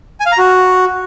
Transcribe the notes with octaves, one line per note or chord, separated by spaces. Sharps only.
G#5
F5
A#5
F#4